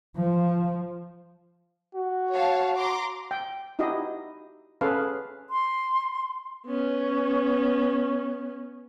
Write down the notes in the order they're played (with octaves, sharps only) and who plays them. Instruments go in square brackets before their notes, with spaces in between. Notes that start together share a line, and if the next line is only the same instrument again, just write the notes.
[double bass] F3
[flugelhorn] F#4
[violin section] C#5 F5 A5
A#5 C6 D6
[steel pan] G5
D#4 E4 F#4 G4 D#5
C#4 G#4 A4 B4 F5
[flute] C6
[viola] B3 C#4